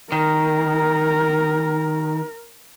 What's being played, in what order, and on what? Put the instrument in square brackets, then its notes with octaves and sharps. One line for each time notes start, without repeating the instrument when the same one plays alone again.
[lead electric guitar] D#3 [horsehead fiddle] A#4